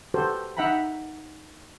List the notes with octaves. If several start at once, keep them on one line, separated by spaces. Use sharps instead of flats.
F#4 G4 A4 B4 C5
D#4 E5 F#5 G5 A#5 B5